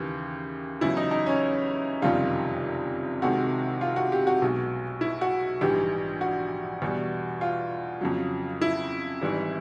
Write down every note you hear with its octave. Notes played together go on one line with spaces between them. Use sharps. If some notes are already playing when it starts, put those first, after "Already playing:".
Already playing: D#2 C#3 E3 G4
E2 C#3 F#3 E4
D#4
D#4
C#4
F#1 F2 C3 D#3 G3 F4
C2 C3 D#3 G#3 F#4
F4
F#4
G4
F#4
B1 B2 G#3
E4
F#4
A#1 G#2 E3 G3 G4
F#4
E2 B2 G3
F4
F2 C#3 F#3
E4
G#1 G#2 E3 G3